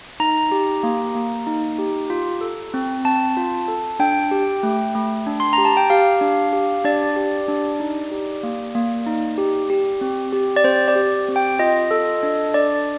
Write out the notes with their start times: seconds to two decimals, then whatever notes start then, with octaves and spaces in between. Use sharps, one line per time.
0.20 D#4 A#5
0.52 G4
0.83 A#3
1.15 A#3
1.47 D#4
1.79 G4
2.10 F4
2.41 A4
2.74 C4
3.05 C4 A5
3.37 F4
3.68 A4
4.00 D4 G5
4.31 G4
4.63 A3
4.95 A3
5.27 D4
5.40 C6
5.53 G4 A#5
5.65 A5
5.77 G5
5.90 G4 F5
6.21 D4
6.53 G4
6.85 D4 D5
7.16 G4
7.48 D4
7.80 D#4
8.11 G4
8.43 A#3
8.75 A#3
9.06 D#4
9.38 G4
9.70 G4
10.01 C4
10.33 G4
10.56 D5
10.64 C4 C5
10.88 D5
10.96 G4
11.28 C4
11.36 G5
11.59 F4 D#5
11.91 A4
12.23 D4
12.54 D4 D5